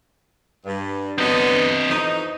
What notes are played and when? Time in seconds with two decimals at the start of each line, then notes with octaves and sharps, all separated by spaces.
0.65 G2
1.18 D3 F#3 B3 C4 D#5
1.89 F2 E3 D#4